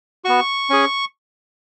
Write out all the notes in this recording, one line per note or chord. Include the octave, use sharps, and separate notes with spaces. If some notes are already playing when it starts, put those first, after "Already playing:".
B3 F#4 C#6
C#4 G#4